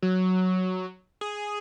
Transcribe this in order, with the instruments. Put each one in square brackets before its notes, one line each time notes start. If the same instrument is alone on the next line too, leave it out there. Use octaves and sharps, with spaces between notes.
[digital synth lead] F#3
G#4